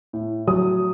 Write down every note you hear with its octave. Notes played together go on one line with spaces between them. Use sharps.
A2
F#3 D#6